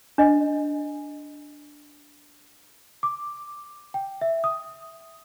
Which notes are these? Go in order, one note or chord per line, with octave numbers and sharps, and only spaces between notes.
D4 D#5
D6
G5
E5
D#6